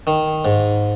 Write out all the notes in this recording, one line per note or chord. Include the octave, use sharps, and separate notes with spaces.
D#3
G#2